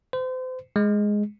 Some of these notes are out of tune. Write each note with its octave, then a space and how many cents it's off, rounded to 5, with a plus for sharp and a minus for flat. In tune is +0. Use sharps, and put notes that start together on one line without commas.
C5 -35
G#3 +0